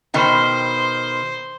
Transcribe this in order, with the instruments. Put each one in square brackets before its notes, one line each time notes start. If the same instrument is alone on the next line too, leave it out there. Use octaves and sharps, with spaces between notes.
[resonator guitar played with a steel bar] B2 D#3 G5 [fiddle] C5